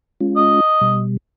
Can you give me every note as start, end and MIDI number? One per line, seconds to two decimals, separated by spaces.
0.21 0.60 56
0.21 0.60 61
0.21 0.60 65
0.36 0.99 75
0.81 1.17 47
0.81 1.17 55